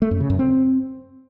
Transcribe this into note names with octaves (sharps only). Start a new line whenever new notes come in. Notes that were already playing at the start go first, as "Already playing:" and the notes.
A3
F#2
C#3
F#2
C4